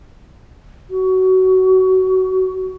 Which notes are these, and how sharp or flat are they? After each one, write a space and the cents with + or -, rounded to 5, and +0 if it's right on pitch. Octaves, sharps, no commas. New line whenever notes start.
F#4 +20